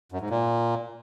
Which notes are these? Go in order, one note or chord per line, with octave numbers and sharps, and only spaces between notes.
F#2
G#2
A#2